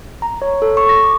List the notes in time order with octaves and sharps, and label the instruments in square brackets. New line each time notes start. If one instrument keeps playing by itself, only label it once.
[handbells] A#5
C#5
A4
C#6
A#6
D6